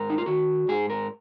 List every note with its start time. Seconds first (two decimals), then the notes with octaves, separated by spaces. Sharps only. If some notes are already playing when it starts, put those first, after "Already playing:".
Already playing: G#2 A#4
0.10 D#4
0.18 F4
0.26 D#3 F#4
0.68 G#2 G#4
0.90 A#4